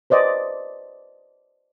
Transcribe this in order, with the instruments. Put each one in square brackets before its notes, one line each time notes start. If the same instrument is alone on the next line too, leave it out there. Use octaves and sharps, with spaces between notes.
[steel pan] B4 C5 D5 D#5